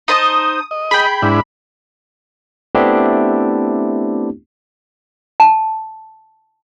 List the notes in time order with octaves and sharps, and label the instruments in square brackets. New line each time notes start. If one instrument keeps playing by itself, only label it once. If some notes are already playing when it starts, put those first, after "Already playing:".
[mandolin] D#4 C5 A5 [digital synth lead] D#6
[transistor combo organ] D#5
[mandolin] G#4 G5 [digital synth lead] B5
[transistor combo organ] G#2 D4 E4
[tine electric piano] A3 B3 C4 D4 E4 G4
[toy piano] A5